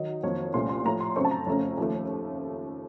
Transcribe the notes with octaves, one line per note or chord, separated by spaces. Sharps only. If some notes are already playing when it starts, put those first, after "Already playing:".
Already playing: D#3 F#3 D#4
F2 D#3 F#3 A#3 C#5
C2 A#2 A3 C#4 C6
C6
A2 F3 A3 A#5
C6
F#2 C#3 A3 C4 C#6
A5
A#5
F2 C#3 A3 C#4
D#2 C#3 F3 A3